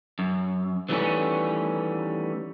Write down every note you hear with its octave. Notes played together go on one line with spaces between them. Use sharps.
F#2
D#3 E3 G3 A3 B3 C#4